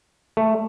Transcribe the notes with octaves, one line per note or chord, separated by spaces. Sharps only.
A3